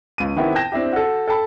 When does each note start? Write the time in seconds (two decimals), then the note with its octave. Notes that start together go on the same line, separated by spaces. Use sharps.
0.18 C#2 D#7
0.36 D#3 B3 C4 E4 G4
0.55 G5 A5 G6 A#6 E7
0.72 C4 D4 E4 G4
0.92 F#4 A4
1.28 A4 G5 A5 B5